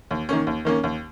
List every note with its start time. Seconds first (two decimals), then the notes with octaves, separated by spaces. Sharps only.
0.11 D#2
0.29 D#3 A#3 C#4
0.47 D#2
0.65 D#3 A#3 C#4
0.84 D#2